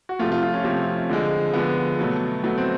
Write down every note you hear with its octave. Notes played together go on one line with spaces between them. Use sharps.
F#4
C3 F3 A3 F4
F4
F4
C#4
C3 F3 A3 C4
D3 F3 G#3
D3 F3 G#3 B3
B2 F#3 A3
B2 F#3 A3 B3
C4